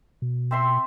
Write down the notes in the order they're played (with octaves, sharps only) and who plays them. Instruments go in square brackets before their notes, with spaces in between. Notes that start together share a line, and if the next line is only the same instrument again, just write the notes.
[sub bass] B2
[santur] C4 E5 C6